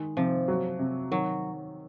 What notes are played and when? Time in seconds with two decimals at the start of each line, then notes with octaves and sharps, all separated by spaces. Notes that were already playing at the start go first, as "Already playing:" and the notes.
Already playing: D#3 G#3
0.17 C3 F3
0.48 F#3
0.79 C3
1.11 D#3 F#3